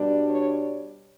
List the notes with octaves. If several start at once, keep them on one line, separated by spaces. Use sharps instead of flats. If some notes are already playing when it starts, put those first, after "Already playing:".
Already playing: B2 G3 D4
C#5